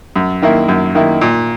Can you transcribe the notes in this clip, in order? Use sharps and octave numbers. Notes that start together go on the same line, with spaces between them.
F#2
D#3 A#3 E4
F#2
D#3 A#3 E4
A#2